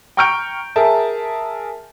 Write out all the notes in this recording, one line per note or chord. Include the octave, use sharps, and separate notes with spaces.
G5 A#5 C#6 F6 G6 D7
G#4 A#4 E5 A5